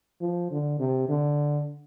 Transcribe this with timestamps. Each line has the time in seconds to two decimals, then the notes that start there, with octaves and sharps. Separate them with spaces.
0.21 F3
0.51 D3
0.79 C3
1.09 D3